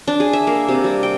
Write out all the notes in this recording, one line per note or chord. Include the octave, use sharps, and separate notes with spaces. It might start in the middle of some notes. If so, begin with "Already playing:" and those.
D4
G#4
E5
A#3
C3
G3
G5